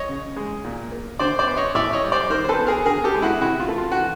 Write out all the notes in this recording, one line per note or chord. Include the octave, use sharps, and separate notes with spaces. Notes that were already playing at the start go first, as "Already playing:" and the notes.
Already playing: C#5 D#5
C#3
G#3
A#2
A#3
D3 C5 D5
C5 D5
B3
C#5 D#5
A2 D5 E5
C#5 D#5
G3
C5 D5
D#3 A#4 C5
C5
A4 B4
B3
G#4 A#4
D3 G#4 A#4
G4 A4
G#3
E4 F#4
C3 E4 F#4
F4
A3
F4
F#4
E3